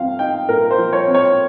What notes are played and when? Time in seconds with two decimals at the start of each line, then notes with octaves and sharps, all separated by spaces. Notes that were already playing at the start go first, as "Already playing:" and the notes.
Already playing: F3 C4 F5
0.19 D#4 G5
0.49 A#2 A#4
0.71 C5
0.78 F3
0.93 C#5
1.07 C4
1.15 C#5